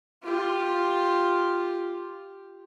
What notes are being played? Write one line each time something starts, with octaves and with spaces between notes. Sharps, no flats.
F4 G4